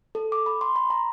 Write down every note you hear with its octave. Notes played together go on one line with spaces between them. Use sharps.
A4
D6
B5
C6
B5
A#5